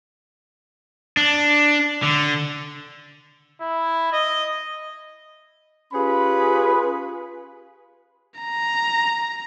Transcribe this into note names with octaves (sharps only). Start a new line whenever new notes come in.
D4
D3
E4
D#5
C#4 F4 G4 G#4 B4 B5
A#5